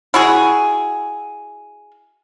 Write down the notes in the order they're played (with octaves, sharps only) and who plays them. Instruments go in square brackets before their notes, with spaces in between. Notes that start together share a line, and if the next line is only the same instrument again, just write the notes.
[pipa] E4 F#4 G#4